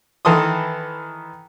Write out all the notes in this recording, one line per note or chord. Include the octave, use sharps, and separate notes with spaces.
D#3 E3 A4 C6 D#6